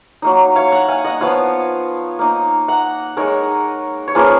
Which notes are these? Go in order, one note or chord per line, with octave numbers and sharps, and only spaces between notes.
F#3 A#3 D#4
C#5 F5
F#5 A#5
F5 G#5
D#5 F#5
F3 B3 F4 C#5 F5
A#3 D#4
F#5 A#5
G#3 D#4 A#4 C#5
C#5
F3 A#3 C#4 F4 G#4 B4